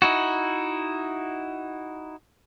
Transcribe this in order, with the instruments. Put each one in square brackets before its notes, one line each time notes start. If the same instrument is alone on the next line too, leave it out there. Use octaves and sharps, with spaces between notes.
[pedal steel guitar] D#4 E4 F#4